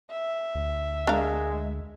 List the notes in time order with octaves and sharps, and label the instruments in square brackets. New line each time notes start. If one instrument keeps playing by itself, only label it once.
[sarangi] E5
[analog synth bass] D2
[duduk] G#3 [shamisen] D4 A#4 F5